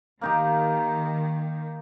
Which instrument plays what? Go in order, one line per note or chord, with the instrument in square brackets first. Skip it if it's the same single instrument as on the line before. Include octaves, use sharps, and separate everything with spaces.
[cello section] D#3 [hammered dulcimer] A#3 D#4 G4